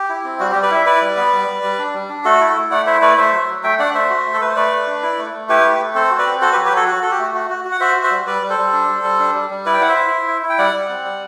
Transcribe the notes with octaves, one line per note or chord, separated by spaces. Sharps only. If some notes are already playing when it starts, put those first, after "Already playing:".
Already playing: G4
E4
C4
G3 F#4
G4
G3
B4 D5
E4 E5
E4 B4 D5
G3
B3
G3
G3
G3
D4
G3
D4
A3 F#4 A4
E4
A3
A3 D5 F#5
E4 C5 E5
A3 B4 D5
A3 C5 E5
F#3
F#3
A3 E5 G5
D4 D5 F#5
A3 C5 E5
F#4
A3
A4
A3 B4
C5
A3 B4 D5
A3
D4
E4
A3
A3
E4 G4 B4
A3
A3
C4 A4 C5
F#4
B4 D5
C4
F#4 A4 C5
G4 B4
F#3
G4 B4
F#3 F#4 A4
F#4
F#4 A4
G4
A3
F#4
F#4
F#4
F#5
F#4 C5 E5
F#4
C5 E5
G3
G3 B4 D5
G3
A4 C5
G3
D4
G3
G3
D4
G3
G3
E4 B4 D5
G5
E4 F#5
C5 E5
E4
E4
E4
E4
G5
G3 D5 F#5
G3
C4
G3